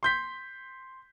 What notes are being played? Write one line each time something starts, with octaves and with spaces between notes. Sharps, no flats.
C6 G6 B6